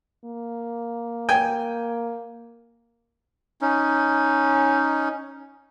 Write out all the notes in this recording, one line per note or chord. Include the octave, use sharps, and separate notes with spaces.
A#3
G5 G#5
C#4 D#4